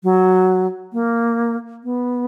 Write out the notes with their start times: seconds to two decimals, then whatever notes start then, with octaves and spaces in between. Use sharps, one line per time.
0.04 F#3
0.93 A#3
1.84 B3